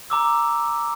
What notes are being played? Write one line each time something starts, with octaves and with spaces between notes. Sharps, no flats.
A#5 D6 E6